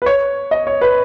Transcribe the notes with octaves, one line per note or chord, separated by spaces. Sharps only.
B4
C#5
D#5
C#5
B4